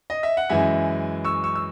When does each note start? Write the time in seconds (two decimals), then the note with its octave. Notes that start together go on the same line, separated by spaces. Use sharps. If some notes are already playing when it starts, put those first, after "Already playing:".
0.10 D#5
0.23 E5
0.37 F#5
0.49 F#2 E3 G#3 E5 G#5
1.25 C#6 E6
1.44 C#6 E6
1.55 E6